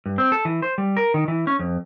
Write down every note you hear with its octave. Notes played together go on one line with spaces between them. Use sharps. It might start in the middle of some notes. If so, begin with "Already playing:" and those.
G2
C4
A4
E3
C5
G3
A#4
D#3
E3
C#4
F2